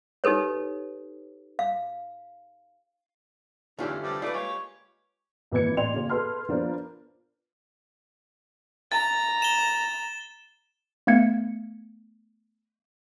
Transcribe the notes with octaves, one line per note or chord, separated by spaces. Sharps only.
D#4 G4 A4 B4 C#5
F5
E2 D3 A3 C#4 D#4 F4 G4 D5
G2 C3 G3 D6
A3 D#4 F4 B4 D5
G#3 A#3 G4 C#5 C#6
G#1 E3 A#3 B4 G#6 C#7
A1 D5 G5 C6 F7
C#3 A#3 C#4
G#4 A4 B4 C6 F6
F3 B3 D4 F4 A#4 C5
A#5 A6
E7 G7
A3 B3 F5 G#6 C#7